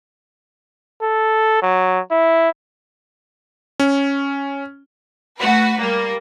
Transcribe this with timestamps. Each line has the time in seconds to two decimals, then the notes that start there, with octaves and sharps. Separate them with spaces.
1.02 A4
1.62 F#3
2.11 E4
3.80 C#4
5.40 A3 F#4 B4
5.79 G3 A#3